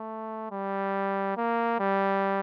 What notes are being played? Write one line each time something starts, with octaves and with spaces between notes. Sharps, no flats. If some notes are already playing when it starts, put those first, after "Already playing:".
Already playing: A3
G3
A#3
G3